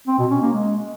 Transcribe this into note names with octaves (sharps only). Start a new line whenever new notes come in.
C4
B2
C#4
A#3
G#3